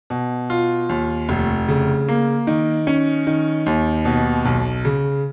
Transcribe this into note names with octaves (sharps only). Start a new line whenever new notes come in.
B2
F4
D#2
F1
C#3
A#3
D#3
C#4
D#3
D#2
B2
B1
C#3